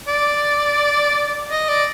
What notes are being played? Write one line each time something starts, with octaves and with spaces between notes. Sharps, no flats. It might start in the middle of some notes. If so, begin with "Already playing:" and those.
D5
D#5
D5